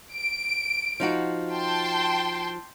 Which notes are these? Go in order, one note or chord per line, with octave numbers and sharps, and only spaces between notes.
D7
F3 D#4 F#4
G5 A5 C6